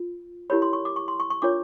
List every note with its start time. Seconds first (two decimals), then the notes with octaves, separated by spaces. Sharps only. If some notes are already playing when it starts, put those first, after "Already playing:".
Already playing: F4
0.50 E4 G4 A#4 C#5 B5
0.62 C6
0.73 C#6
0.85 D6
0.96 C#6
1.08 C6
1.20 C#6
1.30 C#6
1.42 D4 F4 A#4 C#5 D6